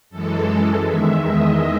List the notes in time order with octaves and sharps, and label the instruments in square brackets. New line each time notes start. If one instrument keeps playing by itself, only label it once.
[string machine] F#2 E3 G#3 A4
E2 D#3 G#3 E5
D#5